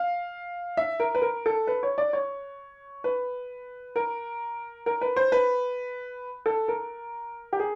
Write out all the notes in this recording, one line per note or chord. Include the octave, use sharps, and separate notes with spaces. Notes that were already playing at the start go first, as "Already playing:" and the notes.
Already playing: F5
E5
A#4
B4
A#4
A4
B4
C#5
D5
C#5
B4
A#4
A#4
B4
C5
B4
A4
A#4
G4
G#4